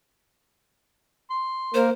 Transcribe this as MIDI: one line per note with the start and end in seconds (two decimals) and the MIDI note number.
1.31 1.89 84
1.74 1.90 58
1.74 1.90 70
1.74 1.91 72